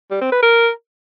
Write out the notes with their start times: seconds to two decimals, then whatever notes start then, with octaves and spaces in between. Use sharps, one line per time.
0.11 G3
0.21 C4
0.32 B4
0.43 A#4